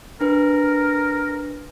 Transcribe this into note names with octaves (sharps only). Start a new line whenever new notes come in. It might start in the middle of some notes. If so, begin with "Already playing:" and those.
D4 A#4 B4